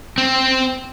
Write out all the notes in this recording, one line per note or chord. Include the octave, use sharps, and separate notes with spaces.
C4